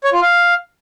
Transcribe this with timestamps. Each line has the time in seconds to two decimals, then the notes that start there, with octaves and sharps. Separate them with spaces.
0.04 C#5
0.13 F4
0.22 F5